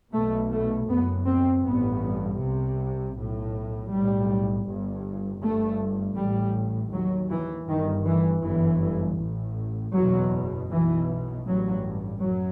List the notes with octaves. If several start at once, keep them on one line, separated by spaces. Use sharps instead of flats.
B1 B2 A3
A3
F#1 F#2 B3
C4
A1 G2 B3
C2 C3
B1 A2
B1 A2 G3
G1 G2
G1 G2 A3
A1 A2 G3
D#2 F#3
E3
G1 G2 D#3
E3
G1 F#2 E3
A1 A2
F#1 E2 B2 F#3
B1 B2 E3
A1 G2 F#3
F#2 F#3